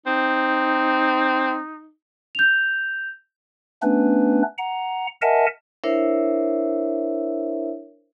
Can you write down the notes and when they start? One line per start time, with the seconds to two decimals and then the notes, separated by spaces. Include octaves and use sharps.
0.06 C4 D#4
2.35 G6 F7
3.82 A3 B3 C#4 D4 B4
4.58 F#5 A#5
5.22 A#4 D#5 E5 F#5 G#5 A5
5.84 D4 E4 A#4 C5 C#5 E5